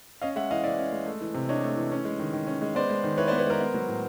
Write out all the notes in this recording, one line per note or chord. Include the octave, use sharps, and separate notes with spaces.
C#4 D#5 F5
G#3 E5 F#5
E3 D#5 F5
E3 D5 E5
C#4
G#3
A3
E3
C3
D4 C#5 D#5
A3
E3
C#4
G#3
D#3
D#3
C#4
G#3
B3 C5 D5
G#3
D#3
E4 B4 C#5
C5 D5
B3
B4 C#5
G#3 A#4 C5
B3
F#3
A2